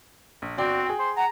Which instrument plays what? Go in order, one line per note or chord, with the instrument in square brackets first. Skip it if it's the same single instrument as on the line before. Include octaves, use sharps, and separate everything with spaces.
[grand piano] A#1
[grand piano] G1 D5 G5 [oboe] C4 [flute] F#4
[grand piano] G#4 G5
[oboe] C5
[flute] F#5 [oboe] A#5